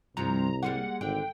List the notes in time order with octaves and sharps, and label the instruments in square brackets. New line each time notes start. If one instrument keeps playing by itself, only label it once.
[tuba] C2 [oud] G2 C3 F3 [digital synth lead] A#5
[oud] G3 G#3 A#3 [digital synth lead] F#5
[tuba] G#1 [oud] D3 [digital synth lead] G5